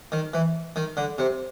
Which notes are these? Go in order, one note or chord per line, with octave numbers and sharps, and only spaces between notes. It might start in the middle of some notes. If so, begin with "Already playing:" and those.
D#3
E3
D#3
D3
C3